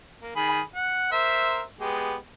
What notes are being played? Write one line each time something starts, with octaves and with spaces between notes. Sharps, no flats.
A#3
D#3 G#4 B5
F#5
A#4 C5 E5
G#3 B3 G4